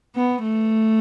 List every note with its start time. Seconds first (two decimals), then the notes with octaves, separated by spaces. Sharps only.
0.15 B3
0.43 A3